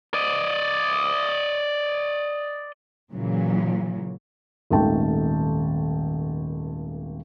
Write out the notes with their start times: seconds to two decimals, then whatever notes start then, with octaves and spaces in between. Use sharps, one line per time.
0.14 D5 D#5
3.12 A#2 C#3 E3 F#3
4.70 D#1 G#1 A3 G5 A5